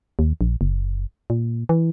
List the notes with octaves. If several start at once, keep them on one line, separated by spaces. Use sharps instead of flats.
D#2
A#1
F#1
A#2
E3